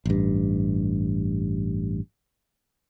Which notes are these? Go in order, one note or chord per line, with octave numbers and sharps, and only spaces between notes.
A1 G2